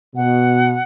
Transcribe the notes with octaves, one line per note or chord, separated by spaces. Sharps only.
B2 F#5